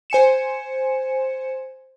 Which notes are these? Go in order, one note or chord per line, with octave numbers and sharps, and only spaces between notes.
C5 G#5 C#7 E7